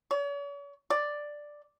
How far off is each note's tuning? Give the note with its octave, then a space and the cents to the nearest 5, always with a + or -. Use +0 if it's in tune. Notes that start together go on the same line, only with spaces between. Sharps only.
C#5 +45
D5 +5